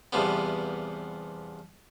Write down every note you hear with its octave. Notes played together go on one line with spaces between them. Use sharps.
E2 C3 F3 G3 B3